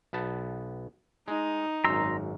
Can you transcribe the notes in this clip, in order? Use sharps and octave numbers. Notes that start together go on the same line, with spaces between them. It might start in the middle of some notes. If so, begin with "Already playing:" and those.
B1 B3 A5
G#3 D#4
G#1 F#2 A#5 C6 E6